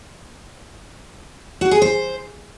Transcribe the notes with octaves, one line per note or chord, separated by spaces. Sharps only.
F#4
G#4
C5